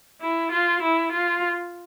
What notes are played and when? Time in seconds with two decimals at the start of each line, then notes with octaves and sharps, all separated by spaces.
0.21 E4
0.52 F4
0.82 E4
1.12 F4